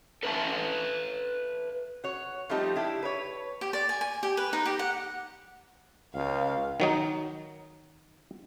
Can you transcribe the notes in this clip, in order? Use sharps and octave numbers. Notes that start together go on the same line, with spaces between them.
A4 B4 E5 F5 A5
F#4 C#5
F3 G3 A3 C4 D#4 G4
D4 E4 G4
B4 C#5
G4
D5
G#5
G#5
G4
B4
D#4
G4
F#5
C#2 F5
D#3 F#3 D#4